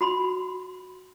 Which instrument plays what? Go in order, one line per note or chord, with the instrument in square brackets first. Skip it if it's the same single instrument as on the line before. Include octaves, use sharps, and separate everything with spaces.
[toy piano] F#4 B5 C6